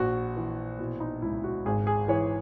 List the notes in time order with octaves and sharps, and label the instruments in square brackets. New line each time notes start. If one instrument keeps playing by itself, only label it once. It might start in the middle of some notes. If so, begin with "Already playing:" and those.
Already playing: [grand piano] A#1 F#4
E3
B2 E4
D#4
C#2 E4
F#4
G#1 G#4
G#4
E3 C#5